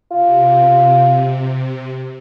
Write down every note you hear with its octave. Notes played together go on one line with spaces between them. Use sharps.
C3 F4